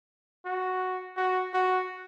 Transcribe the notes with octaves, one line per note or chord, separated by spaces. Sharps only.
F#4
F#4
F#4